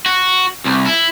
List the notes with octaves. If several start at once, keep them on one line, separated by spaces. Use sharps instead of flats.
F#4
C2
E4